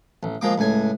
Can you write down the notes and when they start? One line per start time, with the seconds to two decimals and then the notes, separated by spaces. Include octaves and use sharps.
0.23 A1
0.41 F3 G#3 A#3 D6
0.58 C#2 A2 G#5